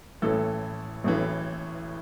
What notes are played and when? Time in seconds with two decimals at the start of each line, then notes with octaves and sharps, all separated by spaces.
0.22 A1 A2 E3 A4
1.04 A1 A2 E3